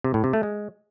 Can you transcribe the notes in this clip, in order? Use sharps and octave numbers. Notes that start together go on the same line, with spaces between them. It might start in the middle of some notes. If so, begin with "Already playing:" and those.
C3
A2
C3
A3
G#3